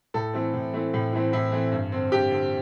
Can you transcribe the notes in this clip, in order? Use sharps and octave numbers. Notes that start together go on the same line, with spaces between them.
A2 A4
E3 A3 C4
A2
E3 A3 C4
A2
E3 A3 C4
A2 E4
E3 A3 C4
G2
D3 C4
G2 G4
D3 C4